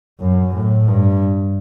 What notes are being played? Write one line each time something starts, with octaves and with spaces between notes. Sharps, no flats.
F#2
A2
G2